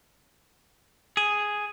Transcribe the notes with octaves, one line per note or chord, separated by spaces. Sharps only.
G#4